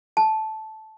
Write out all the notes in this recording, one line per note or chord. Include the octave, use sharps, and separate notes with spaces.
A5